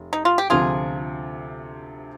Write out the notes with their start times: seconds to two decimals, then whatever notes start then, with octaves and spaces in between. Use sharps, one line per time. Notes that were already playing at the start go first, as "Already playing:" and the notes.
Already playing: F1
0.13 D#4
0.25 F4
0.38 G4
0.50 D2 C3 F3 F4 G#4